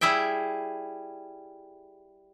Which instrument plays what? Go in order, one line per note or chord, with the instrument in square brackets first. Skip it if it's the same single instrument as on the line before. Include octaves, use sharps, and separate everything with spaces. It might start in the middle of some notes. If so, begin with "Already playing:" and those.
[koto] G3 E4 G#4 E5 G5